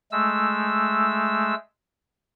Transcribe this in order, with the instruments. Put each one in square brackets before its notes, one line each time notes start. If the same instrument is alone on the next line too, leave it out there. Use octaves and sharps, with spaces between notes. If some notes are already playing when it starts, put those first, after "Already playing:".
[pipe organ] G#3 A3 E6